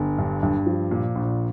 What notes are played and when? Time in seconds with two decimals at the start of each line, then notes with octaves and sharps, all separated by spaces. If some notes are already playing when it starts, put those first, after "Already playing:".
Already playing: G1
0.18 G2
0.43 G2
0.66 F3
0.91 A#2
1.15 A#1